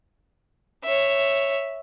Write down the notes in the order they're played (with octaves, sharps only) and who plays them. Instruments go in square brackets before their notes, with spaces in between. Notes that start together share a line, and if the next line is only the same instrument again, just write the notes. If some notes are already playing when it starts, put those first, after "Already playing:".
[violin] C#5 E5